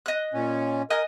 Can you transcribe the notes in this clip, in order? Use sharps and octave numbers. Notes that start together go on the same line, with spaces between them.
D#5 F#6
A#2 C#4
A#4 D#5 G#5 F#6